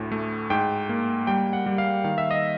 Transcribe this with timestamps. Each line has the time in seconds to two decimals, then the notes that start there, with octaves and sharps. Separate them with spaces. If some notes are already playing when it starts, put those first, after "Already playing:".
Already playing: D2 A2
0.12 A3
0.50 G#2 G5
0.89 A#3
1.27 G3 G5
1.53 F#5
1.66 G3
1.78 F5
2.04 D#3 F5
2.18 E5
2.31 D#5